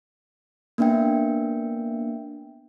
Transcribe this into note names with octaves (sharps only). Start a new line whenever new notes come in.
A#3 B3 D4 E5 G5